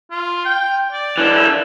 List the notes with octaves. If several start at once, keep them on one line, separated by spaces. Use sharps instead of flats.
F4
G5
D5
E3 D4
E5